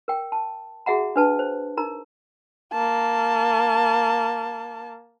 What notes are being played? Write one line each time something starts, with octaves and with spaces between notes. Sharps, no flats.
A#4 G5
A5
F#4 G#4 E5 F#5 A#5
D4 B4 A5
C5
D#4 A#4 A#5
A#3 A5